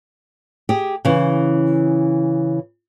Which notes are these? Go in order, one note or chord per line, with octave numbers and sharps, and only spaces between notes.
G4 G#4
C#3 E3